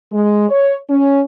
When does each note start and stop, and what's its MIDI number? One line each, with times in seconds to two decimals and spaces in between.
0.12 0.46 56
0.49 0.76 73
0.90 1.22 61